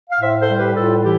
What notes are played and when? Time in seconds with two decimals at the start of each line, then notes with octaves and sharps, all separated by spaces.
0.10 F5
0.21 A2 C5 E5
0.39 A4 C5
0.49 G3
0.57 G4 B4
0.75 A2 F4 A4
1.03 E3 E4 G4